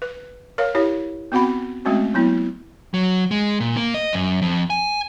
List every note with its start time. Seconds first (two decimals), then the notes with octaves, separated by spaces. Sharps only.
0.02 B4
0.58 A#4 C#5 F5
0.75 E4 G4 C#5
1.32 B3 C4 F#4 F#5 B5
1.85 G#3 A3 C4 C#4 F#4
2.14 F#3 B3 E4
2.94 F#3
3.31 G#3
3.60 A#2
3.77 A#3
3.94 D#5
4.13 F#2
4.42 F2
4.70 G#5